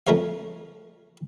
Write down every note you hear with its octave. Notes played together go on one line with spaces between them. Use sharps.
F2 A3 A#4 C#5 F5